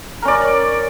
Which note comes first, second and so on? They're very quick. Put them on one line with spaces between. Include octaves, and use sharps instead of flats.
A#4 C#4 D5